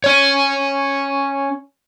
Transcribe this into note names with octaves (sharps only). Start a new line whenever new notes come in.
C#4 C#5